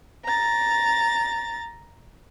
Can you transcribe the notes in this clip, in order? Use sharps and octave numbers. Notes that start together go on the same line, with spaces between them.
A#5 A6